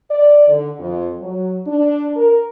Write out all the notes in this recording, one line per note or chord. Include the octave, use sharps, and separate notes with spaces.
D5
D3
F2
F#3
D4
A#4